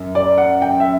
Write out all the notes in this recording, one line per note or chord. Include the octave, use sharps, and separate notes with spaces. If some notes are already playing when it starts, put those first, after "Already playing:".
Already playing: F#2
D5
F#5
G5
E5